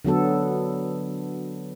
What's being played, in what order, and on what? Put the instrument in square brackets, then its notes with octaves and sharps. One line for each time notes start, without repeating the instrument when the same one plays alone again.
[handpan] D3 F#3 B3 A4